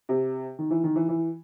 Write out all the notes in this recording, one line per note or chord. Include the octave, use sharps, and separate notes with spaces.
C3
D#3
E3
D#3
E3
E3